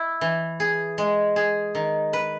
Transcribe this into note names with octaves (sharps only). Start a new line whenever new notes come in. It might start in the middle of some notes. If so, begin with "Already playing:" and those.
Already playing: E4
E3
G#4
G#3
G#4
D#3
B4